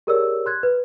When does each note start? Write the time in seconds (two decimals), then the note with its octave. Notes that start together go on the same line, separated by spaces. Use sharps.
0.07 G4 G#4 A#4 C#5 D5 E6
0.46 C6 F#6 G#6
0.63 B4